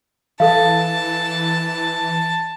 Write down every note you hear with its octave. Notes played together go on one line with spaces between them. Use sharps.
E3 A4 F5 A5